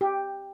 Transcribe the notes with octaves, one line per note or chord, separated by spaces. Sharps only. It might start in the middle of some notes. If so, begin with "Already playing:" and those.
G4